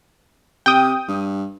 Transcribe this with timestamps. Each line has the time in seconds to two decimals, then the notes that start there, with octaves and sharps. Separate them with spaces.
0.66 C3 G5 D#6
1.08 G2